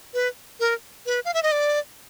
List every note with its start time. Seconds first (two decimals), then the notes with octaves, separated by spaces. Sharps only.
0.14 B4
0.60 A#4
1.06 B4
1.25 F5
1.34 E5
1.43 D#5
1.52 D5